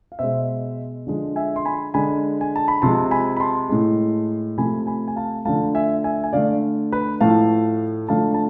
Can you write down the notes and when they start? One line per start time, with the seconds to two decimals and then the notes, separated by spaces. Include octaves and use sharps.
0.12 F5
0.19 B2 G#3 C5 E5
1.07 D3 F3 G#3
1.36 E5 G#5
1.56 C6
1.65 G#5 B5
1.94 D3 G#3 G#5 B5
2.41 G#5
2.56 A5
2.68 B5
2.82 C3 F3 G#3 A5 C6
3.11 G#5 B5
3.37 B5
3.40 A5 C6
3.69 A2 G#3
4.58 C3 F3 A3 G#5 B5
4.87 G#5 B5
5.08 G#5
5.16 F5 A5
5.45 D3 F3 A3 F5 A5
5.75 E5 G#5
6.04 E5 G#5
6.24 G#5
6.33 D3 A3 D5 F5
6.92 B4
7.21 A2 F3 A3 F5 A5
8.09 D3 F3 A3 F5 A5
8.34 A5